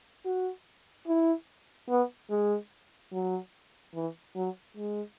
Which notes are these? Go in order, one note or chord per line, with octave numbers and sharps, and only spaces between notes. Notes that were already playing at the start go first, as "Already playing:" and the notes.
F#4
E4
B3
G#3
F#3
E3
F#3
G#3